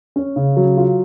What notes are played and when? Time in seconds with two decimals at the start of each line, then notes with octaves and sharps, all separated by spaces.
0.16 C#4
0.36 C#3
0.57 F#3
0.77 F4